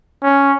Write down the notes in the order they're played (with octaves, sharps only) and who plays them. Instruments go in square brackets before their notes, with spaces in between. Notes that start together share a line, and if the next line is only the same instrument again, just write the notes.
[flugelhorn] C#4